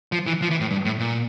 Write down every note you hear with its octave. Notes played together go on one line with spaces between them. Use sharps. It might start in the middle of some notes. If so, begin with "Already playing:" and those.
F3
E3
F3
E3
A2
G2
A2
A#2